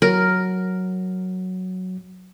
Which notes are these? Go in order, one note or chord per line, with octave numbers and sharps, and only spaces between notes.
F#3 A#4